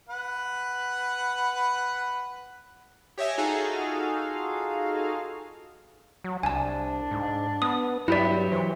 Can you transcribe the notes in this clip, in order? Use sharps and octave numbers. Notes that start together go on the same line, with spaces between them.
B4 F#5
G4 C#5 D#5 E5 G#5
D#4 F4 F#4 G#4 A4 F5
F#3
C2 D4 G#5 A5
G#2
B3 D#6
G2 F#3 E4 G4 B4 D5 E5
E3 C5